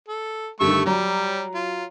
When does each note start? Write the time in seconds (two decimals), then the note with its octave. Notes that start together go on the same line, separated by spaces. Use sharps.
0.08 A4
0.60 G2 D3 D#3 A3 C#6 E6
0.86 F#3 G3 A#5
1.55 F4